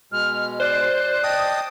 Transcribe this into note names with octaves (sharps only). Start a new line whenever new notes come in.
B2 G#3 F6
C5 D5 F#6
D#5 G5 A5 D#6